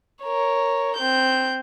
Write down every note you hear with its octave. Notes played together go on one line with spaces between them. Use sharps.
A#4 C#5
C4 G6